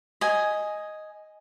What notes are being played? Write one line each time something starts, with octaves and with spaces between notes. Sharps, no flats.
D#5 G#5